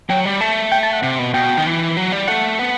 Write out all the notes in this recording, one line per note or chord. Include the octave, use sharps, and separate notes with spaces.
F#3 G5
G3
A3 A5
G5
A5
F#5
C3
B2
B2 G5
D#3
E3
F#3
G3
A3 F#5
B3